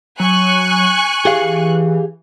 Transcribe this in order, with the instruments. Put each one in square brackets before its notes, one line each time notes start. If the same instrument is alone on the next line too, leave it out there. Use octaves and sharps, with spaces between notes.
[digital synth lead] F#3 [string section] G#5 C#6 F#6
[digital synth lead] E3 [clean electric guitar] G4 G#4 F5